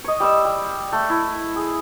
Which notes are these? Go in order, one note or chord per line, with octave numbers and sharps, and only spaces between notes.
C#5 D#5
G3 E6
G3
A3
E4
G#4